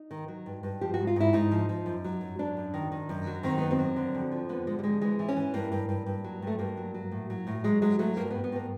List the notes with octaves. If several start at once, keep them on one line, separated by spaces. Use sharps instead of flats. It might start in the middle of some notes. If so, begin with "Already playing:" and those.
Already playing: D#4
D#3
F#3
G2
G2
F3 G4
G#2 F#4
F4
G#2 E4
G#2 D#4
F3
F3
F#2
F#3
F#2
F#3 D4
F#2
D#3
D#3
F#2
F#3
D#3 C4
F#2 B3
C4
F#3
D3
F2
F3
D3 B3
D3 G#3
G3
F2 G#3
E3 G#3
E3
C#4
E3
G2 A#3
G2
G2
G2
F#3
G2 A3
G2 A#3
F#3
F#3
A2
F#3
A2
F#3 G#3
F#3 G#3
F#3 A3
G2 A#3
B3
G2
B3
G2 A#3